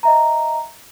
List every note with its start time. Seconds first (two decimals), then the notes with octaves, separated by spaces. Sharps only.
0.03 D#5 E5 A#5